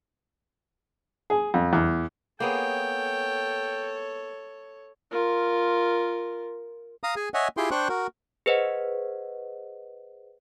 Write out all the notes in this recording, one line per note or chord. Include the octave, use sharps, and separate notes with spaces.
G#4
F2
E2
A#3 B3 G#4 A4 C#5 G5
F4 A#4
F5 A#5 D#6
G#4 G#5
C#5 D#5 E5 F#5 G#5
E4 F4 G4 G#4 G5 C6
D4 C5 G5 C#6 F#6
F#4 A#4
G#4 B4 C5 D#5 F#5